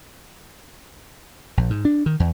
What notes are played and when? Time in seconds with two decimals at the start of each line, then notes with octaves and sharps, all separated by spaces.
1.57 A#1
1.70 G#2
1.85 D4
2.06 D#3
2.20 E2